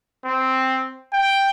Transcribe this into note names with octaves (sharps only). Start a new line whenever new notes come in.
C4
G5